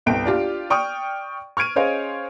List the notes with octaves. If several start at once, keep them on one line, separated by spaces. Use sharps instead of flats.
G1 C2 G5 D7
D4 F4 G4
D5 G5 C#6 D#6 F6
C#6 F6 G#6 D7 D#7
C#4 G#4 C5 C#5 D#5 F5